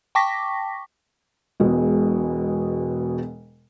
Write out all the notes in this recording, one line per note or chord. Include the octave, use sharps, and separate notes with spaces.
G5 A5 C#6 D6 A#6 B6
E1 B2 G#3